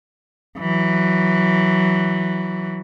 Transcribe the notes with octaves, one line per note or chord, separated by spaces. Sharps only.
E3 F#3